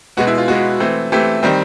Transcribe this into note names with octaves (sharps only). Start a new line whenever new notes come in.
B2 G#3 B3 F#4
E4
F4
B2 G#3 B3 F#4
E3 A3 C4
E3 A3 C4 G4
D#3 G3 C4